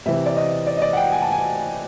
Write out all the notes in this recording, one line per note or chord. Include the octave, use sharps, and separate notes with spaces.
C3 E3 E5
D5
D#5
D5
D#5
D5
F#5
G5
G#5
A5
G#5